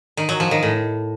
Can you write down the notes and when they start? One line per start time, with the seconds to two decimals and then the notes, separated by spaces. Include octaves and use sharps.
0.17 D#3
0.29 F#3
0.40 F3
0.51 D#3
0.63 A2